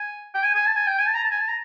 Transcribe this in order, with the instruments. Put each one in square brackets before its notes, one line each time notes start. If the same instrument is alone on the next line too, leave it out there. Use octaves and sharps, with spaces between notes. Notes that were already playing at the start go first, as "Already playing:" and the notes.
Already playing: [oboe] G#5
G5
G#5
G#5
A5
G#5
G5
G#5
A5
A#5
A5
G#5
A5
A#5